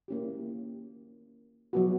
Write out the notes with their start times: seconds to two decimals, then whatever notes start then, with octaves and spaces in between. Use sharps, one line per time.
0.08 A#3 C#4 E4 G4
1.73 F#3 B3 F#4